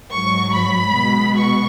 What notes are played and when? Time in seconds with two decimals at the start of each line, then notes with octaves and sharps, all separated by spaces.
0.12 G#2 F#3 C#6
0.53 B5
0.95 B2 G#3
1.38 C#6